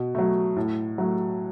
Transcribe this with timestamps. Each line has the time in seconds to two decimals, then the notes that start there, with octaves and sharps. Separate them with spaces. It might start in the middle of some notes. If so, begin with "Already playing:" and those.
Already playing: B2
0.15 F#3 A3
0.56 A2
0.98 F#3 A3